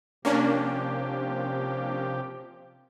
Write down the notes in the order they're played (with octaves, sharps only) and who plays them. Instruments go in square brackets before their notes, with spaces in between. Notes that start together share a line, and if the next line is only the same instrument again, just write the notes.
[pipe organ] C3 F3 G4 [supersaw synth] A#3 C#4 D4